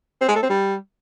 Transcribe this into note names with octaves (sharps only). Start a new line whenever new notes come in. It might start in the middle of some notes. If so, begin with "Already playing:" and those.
C4
G#3
A3
C4
G3